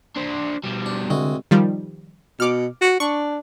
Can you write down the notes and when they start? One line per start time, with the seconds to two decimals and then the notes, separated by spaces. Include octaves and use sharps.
0.16 D4 C5
0.64 B2 G3
0.86 D4
1.10 C2 D3 G#3 F#4
1.51 D#3 F3 G3
2.40 B2 D6 F6
2.81 F#4
3.00 D4 C#6